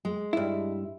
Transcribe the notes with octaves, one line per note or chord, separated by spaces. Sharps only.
G#3
G2 E4